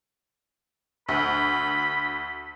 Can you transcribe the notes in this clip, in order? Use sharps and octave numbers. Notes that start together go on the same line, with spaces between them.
D2 B5